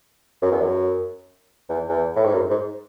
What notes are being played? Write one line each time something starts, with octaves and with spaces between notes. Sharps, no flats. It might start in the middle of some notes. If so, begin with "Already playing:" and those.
F#2
E2
F#2
E2
E2
A2
G#2
F#2
G#2